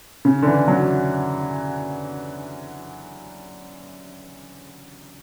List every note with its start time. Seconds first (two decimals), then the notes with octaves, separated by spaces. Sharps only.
0.25 C#3
0.42 D3
0.46 E3
0.68 F#3